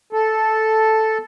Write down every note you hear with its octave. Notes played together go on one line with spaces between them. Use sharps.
A4